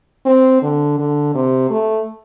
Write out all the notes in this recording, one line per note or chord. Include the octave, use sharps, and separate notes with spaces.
C4
D3
D3
C3
A3